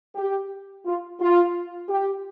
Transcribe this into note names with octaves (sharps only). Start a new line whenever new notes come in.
G4
F4
F4
G4